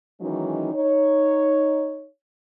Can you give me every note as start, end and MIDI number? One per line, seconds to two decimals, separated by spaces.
0.21 0.73 51
0.21 0.73 52
0.21 0.73 54
0.21 0.73 56
0.21 0.73 61
0.21 0.73 63
0.74 2.06 63
0.74 2.06 73